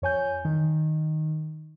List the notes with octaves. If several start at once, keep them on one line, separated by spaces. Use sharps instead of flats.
F2 C#5 G#5 G6
D#3